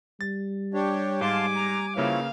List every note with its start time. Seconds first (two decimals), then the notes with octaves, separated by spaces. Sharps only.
0.21 G3 A6
0.74 D4 G4 C#5
1.21 G#2 F5 G#5 A5 C6 D6
1.55 A#5
1.97 C#3 F3 A#3 E4 B4 C#5 F5